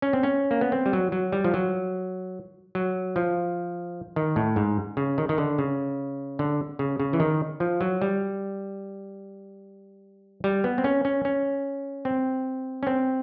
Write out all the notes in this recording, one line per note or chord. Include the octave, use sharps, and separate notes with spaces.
C#4
C4
C#4
A#3
B3
C4
G3
F#3
F#3
G3
F3
F#3
F#3
F3
D#3
A2
G#2
C#3
D#3
D#3
D3
C#3
D3
C#3
C#3
E3
D#3
F3
F#3
G3
G3
B3
C4
C#4
C#4
C#4
C4
C#4
C4